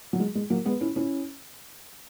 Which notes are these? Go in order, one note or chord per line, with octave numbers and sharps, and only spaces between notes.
F#3
G#3
G#3
F#3 A#3
G#3 B3
C#4 E4
C#4 E4